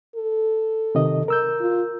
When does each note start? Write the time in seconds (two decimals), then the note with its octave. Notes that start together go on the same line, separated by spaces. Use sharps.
0.16 A4
0.95 C3 D#3 D#5
1.28 A#4 E6 G6
1.61 F4